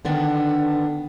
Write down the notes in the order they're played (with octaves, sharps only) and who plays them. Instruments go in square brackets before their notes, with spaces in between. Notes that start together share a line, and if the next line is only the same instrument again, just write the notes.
[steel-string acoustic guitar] D3 D#3 B3 D4